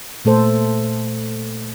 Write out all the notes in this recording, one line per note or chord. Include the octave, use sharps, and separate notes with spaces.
A#2 A3 A4 C5